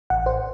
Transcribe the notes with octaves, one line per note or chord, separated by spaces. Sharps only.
A1 F#5
C5